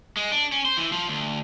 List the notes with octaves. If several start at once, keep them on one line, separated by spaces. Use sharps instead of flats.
G#3
D4
C#4
C5
E3
F3
D2